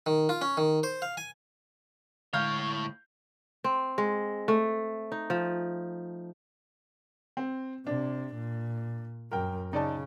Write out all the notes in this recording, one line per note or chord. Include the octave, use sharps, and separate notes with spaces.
D#3
F4
C#4
D#3
C5
F5
G#5
A2 D3 G#3 C#5 F5 F6 G6
C4
G#3
A3
D#4
F3
C4
C3 D4
A#2
F#2 A#4 G5
C#3 D#4 D5 A5